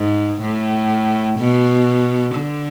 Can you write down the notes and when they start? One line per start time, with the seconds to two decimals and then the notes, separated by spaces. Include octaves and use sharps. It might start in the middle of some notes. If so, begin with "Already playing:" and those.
Already playing: G#2
0.41 A2
1.39 B2
2.35 D3